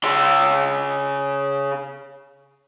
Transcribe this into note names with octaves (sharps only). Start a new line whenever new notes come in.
C#3 C6